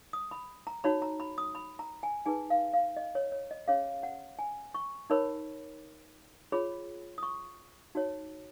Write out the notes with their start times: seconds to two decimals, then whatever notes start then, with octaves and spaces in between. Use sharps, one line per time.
0.13 D#6
0.31 B5
0.67 A#5
0.84 D#4 F#4 C#5 B5
1.02 A#5
1.20 B5
1.38 D#6
1.55 B5
1.79 A#5
2.03 G#5
2.26 D#4 G#4 B4 G#5
2.50 F5
2.74 F5
2.97 D#5
3.15 C#5
3.32 C#5
3.51 D#5
3.68 C#4 G#4 C#5 F5
4.03 F#5
4.39 G#5
4.74 C#6
5.10 D#4 A#4 C#5 B5
6.52 F4 G#4 C#5 B5
7.18 D#6
7.23 C#6
7.95 D#4 F#4 C#5